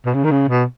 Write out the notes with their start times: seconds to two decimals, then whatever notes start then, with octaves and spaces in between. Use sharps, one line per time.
0.06 B2
0.14 C#3
0.24 D#3
0.31 C#3
0.49 B2